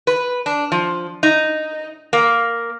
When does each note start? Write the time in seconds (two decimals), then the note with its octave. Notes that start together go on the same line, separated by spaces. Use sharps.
0.07 B4
0.46 D4
0.72 F3
1.23 D#4
2.13 A#3